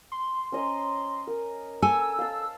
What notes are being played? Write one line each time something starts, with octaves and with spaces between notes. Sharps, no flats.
C6
C#4 D#5 A#5
A#4
A4 G#5 E6
F5 A5